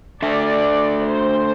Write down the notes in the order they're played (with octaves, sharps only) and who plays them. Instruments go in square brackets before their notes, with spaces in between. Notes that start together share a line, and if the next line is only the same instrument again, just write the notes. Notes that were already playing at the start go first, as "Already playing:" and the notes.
[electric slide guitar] A3 D4 A4 E5 [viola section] D5
[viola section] C5